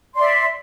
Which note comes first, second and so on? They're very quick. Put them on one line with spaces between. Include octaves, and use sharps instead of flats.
C6 D5 E5